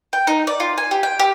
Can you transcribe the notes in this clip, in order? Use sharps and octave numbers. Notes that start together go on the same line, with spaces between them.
G5
D#4
D5
F4
G#5
G4
G5
G4